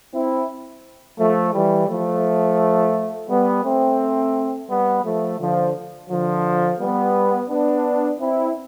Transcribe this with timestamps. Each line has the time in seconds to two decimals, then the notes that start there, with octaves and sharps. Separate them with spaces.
0.13 C4 E4
1.18 F3 A3
1.53 E3 G3
1.89 F3 A3
3.29 G3 B3
3.64 A3 C4
4.69 G3 B3
5.04 F3 A3
5.39 D3 F3
6.10 D3 F3
6.80 G3 B3
7.49 B3 D4
8.20 C4 E4